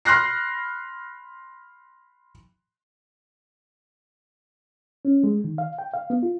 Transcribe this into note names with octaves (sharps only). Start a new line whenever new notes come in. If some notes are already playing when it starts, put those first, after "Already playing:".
B5 C6 F6 F#6 A#6 C7
C#4
G#3
D#3
F5
G5
F5
B3
F4